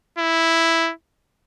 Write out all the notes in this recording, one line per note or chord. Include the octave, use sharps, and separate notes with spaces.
E4